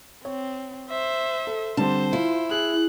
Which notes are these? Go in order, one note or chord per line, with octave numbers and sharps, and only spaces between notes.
C4 C#5
C5 E5
A4
D3 G3 C4 C5 A5
E4 F4
G#4 F#6